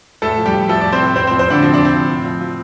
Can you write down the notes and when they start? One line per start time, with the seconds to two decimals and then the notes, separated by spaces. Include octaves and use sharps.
0.22 A2 A3 A4
0.38 F3
0.46 G3 G4
0.54 F3
0.69 F3 A3 A4
0.81 F3 D5
0.92 C4 C5
1.00 A2
1.16 A2 C4 C5
1.27 C4 C5
1.31 F3
1.39 C4 C5
1.47 A2 D3 D4
1.62 F3 C4
1.74 F3 D4
1.85 C4
1.94 F3
2.09 A2
2.25 F3
2.41 F3